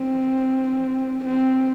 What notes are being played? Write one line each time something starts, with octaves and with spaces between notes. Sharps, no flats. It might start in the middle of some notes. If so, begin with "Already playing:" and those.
Already playing: C4
C4